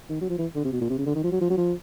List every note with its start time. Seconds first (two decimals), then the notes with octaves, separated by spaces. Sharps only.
0.09 D#3
0.21 F#3
0.29 F3
0.38 E3
0.55 D3
0.64 C3
0.72 B2
0.81 A#2
0.89 C3
0.98 C#3
1.06 D3
1.15 D#3
1.24 F3
1.32 F#3
1.41 F3
1.50 F#3
1.57 F3